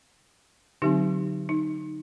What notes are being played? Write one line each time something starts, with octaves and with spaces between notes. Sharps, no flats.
D3 F#3 C4 D#4 G4
D#4